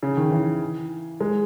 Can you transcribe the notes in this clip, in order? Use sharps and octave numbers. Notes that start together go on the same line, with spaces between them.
C#3
D#3
E3
G#3